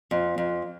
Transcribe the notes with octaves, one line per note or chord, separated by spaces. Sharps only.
F2
F2